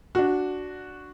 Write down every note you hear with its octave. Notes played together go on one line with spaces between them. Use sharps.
D4 F#4